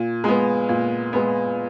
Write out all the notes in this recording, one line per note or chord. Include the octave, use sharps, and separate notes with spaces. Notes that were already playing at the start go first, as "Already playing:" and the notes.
Already playing: A#2
G#3 B3
A#2
G#3 B3